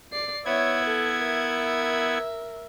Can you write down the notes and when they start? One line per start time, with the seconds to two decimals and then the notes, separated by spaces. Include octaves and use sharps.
0.13 D5 C7
0.45 B3 E4 C#5 E5 G#6
0.85 A4
1.23 A#4 E5